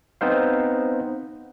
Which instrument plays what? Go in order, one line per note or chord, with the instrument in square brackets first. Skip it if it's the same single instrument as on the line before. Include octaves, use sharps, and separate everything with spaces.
[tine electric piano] B3 C4 D#4 C5 F5